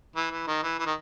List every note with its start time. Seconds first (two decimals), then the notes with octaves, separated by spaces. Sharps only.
0.16 E3
0.31 E3
0.47 D#3
0.63 E3
0.79 E3
0.86 D#3